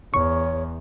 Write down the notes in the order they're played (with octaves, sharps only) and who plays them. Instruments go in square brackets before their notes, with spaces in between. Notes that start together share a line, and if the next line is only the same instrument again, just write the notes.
[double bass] E2 [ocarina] C#5 [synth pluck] C#6